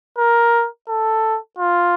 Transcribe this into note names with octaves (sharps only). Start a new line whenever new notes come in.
A#4
A4
F4